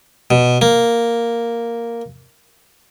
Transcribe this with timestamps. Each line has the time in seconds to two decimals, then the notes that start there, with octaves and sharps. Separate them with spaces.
0.31 B2
0.61 A#3